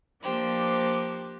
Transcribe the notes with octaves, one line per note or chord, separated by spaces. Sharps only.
F3 A#3 D4 G4 C5